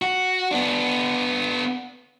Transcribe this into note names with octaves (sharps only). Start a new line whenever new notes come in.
F#4
B3 D4